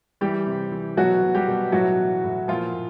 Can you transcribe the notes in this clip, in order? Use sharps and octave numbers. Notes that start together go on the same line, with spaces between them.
E3 G3 G4
C3
E3
B2 F#3 F#4
B2
G3 G4
B2
A2 F#3 F#4
E3
A2
A#2 F3 F4
A#2